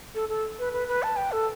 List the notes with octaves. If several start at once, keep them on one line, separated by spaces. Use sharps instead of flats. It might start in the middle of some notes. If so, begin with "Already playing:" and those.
A4
A4
B4
B4
B4
A5
G5
A4